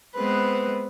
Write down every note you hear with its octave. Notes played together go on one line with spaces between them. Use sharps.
G#3 B3 C4 B4